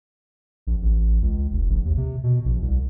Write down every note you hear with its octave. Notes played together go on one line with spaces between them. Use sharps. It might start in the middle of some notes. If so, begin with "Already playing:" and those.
A#1
A1
C#2
F1
A#1
D#2
C3
B2
A#1
C2